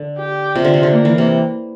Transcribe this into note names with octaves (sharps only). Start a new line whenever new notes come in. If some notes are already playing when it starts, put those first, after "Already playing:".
Already playing: D3
G4
C3 F4
D3
C3
D3
A#3
E3
C3